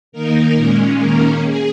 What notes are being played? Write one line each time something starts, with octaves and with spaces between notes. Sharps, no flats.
D#3 A#3 D#4 A#4
A#2 G#3 C#4
D#3 A#3 C#4 A#4
G#4